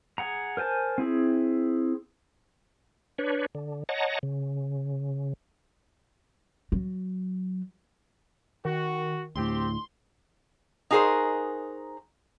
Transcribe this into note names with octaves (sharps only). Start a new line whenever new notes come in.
G#4 F#5 A#5
A#4 C5 G#5 A5
C4 E4 G#4
D4 B4 C#5
D3
C#5 D#5 F#5 A5 A#5
C#3
F#3
D#3 F#4
D2 A2 C4 G4 C6
D#4 F#4 G#4 A#4 C5